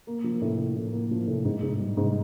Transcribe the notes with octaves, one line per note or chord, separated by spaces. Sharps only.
A#3
F3
A2
A2
A2
A#3
F3
A2
G#2
G#2
G3
G#2